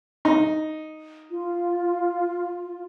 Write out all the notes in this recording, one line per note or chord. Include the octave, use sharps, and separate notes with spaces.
D#4
F4